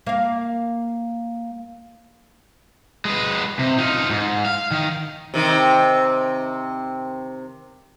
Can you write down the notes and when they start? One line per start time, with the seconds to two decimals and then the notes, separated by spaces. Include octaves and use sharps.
0.07 A#3 F5
3.05 G#3 B4
3.59 C3
3.78 D#4 F4
4.10 G#2
4.45 F5
4.71 D#3
5.34 C3 D#3 C4